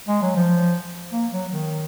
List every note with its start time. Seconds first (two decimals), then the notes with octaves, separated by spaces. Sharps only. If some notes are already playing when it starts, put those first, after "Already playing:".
0.08 G#3
0.22 F#3
0.36 F3
1.12 A#3
1.32 F#3
1.51 D#3